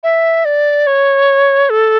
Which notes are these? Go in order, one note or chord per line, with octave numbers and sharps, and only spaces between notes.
E5
D5
C#5
A4